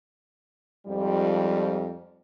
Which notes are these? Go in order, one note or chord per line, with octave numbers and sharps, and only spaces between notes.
F2 G#2 F3 G3